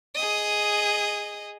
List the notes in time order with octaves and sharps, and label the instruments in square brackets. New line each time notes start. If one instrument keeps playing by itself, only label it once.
[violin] G#4 D#5